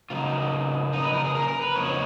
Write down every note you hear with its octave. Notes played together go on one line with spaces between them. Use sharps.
C#3 F#3 A#3 D#4 F4
D#4
B4
A#4
G#4
A#4
A#4
B4
F2 C#3 F#3 A#3 D#4 C#5